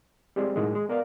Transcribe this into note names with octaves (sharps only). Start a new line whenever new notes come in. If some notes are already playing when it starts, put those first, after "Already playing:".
G3 G#3 C4 G#4
A2 D#3 F#3 G#3
G#3
B3 A#4 D5 F5